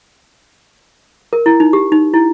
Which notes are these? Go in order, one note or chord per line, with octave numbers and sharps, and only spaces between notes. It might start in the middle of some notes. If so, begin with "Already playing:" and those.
A#4
E4
D#4
G4
D#4
E4